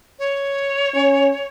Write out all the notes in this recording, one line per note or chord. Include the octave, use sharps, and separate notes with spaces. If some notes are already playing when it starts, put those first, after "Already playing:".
C#5
C#4